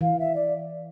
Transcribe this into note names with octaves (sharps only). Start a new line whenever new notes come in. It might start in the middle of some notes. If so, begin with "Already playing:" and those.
E3 F5
E5
D5